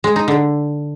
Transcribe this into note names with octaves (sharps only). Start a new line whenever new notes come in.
G#3
D#4
D3